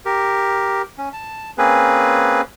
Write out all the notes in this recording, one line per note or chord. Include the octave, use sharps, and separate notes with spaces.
G4 A#4
C#4
A5
A#3 C4 C#4 G#4 B4